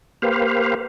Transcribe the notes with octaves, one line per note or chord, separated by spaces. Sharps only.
A#3 G4 B4 C5 F5